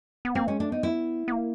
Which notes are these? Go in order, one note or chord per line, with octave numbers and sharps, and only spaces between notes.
B3
A#3 C4
G#3 C#4
A3 D4
B3 D#4
E4
B3
A#3